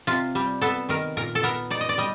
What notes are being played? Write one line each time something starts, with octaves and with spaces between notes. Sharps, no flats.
C3 F4
G3
B3 A4
D#3 A#4
A#2 A#4
A4
B3 A#4
D#4 D5
D#5
D5
G3 D#5